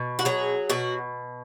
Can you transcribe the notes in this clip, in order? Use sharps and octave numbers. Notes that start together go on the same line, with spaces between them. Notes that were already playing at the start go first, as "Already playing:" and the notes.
Already playing: B2
F#4
F#3 G#4
B2 F#4